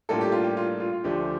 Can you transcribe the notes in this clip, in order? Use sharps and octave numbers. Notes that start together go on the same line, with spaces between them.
A2 G3 A#3 D4 F4 A4
G4
F4
G4
F4
F4
F4
D2 D3 F3 A3 D4 G4